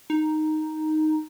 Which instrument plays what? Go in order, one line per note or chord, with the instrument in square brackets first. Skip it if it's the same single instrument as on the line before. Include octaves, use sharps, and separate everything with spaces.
[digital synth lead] D#4